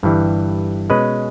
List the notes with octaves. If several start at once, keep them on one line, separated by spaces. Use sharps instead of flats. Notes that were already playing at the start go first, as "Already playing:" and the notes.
G1 G2 E3 G3
B2 G#3 C#4 G#4 B4